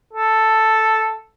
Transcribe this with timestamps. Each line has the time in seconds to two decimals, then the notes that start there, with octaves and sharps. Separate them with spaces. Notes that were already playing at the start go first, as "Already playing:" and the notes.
0.14 A4